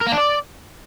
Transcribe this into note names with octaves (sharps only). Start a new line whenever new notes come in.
A#4
A#3
D4
D5